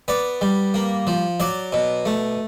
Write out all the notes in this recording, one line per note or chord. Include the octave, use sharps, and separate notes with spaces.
B3 D5
G3
A#3
F3
F#3 D5
B2
A3